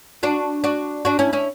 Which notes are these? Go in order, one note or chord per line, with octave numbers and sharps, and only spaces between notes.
D4 F#4
D4 F#4
D4 F#4
C#4 E4
C#4 E4